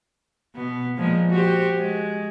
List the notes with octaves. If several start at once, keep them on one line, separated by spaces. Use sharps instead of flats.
B2 B3
A#2 F3 G#3
F#4 G4 C5
G#3